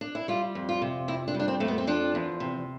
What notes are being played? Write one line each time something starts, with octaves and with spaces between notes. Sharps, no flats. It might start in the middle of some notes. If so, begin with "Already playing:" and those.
D4
E4
G3 F4
F2
F4
C3
F2 E4
D4
G3
D4
C4
F2 A3
B3
C4
F3 D4
E2
C3